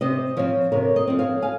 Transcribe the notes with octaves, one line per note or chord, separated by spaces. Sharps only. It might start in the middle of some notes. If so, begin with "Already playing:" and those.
C3 C5 D#5
F3 C4 C#5 F5
C3 A#4 C#5
C5 D#5
F3 C4
C#5 F5
F5 G#5